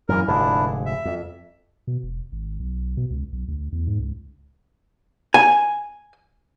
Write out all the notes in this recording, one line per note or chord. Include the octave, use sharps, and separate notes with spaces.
F#2 A#2 E3 A#4
F1 G#2 D3 D4 E4
E5
F2
B2
E1
G#1
B1
B2
C#2
B1
D2
E2
G#2
C#2
G#5